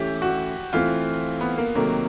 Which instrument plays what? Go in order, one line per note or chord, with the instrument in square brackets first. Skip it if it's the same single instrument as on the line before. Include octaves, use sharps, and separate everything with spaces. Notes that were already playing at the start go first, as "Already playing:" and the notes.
Already playing: [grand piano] E3 A3 C#4 E4 [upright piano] G4
[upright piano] F#4
[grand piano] E3 A3 C4 [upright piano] F4
[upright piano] B3
A#3
[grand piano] C3 D#3 F#3 A#3 [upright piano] A3